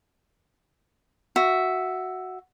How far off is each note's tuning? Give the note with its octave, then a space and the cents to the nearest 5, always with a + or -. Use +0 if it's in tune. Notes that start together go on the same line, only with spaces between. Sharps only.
F#4 +0 E5 +0